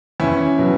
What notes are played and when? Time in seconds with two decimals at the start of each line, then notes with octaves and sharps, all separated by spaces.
0.20 E2 C#4 E4
0.58 B2 F#3